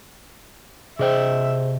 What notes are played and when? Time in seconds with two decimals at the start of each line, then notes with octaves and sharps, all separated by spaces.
0.99 C3 G#4 C5 D#5 E5 G5